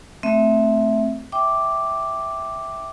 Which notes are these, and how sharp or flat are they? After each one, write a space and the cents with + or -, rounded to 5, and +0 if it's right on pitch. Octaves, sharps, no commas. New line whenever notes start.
A3 +0 C4 +0 E5 +0
E5 -5 G5 +0 D6 +0